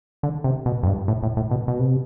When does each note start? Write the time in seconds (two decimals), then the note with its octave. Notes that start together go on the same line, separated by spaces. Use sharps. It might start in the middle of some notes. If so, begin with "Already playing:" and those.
0.23 D3
0.44 C3
0.66 B2
0.83 F2
0.87 G2
1.08 A2
1.23 A2
1.37 A2
1.51 B2
1.68 B2
1.79 C3